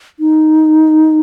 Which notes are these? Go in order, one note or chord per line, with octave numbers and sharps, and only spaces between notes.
D#4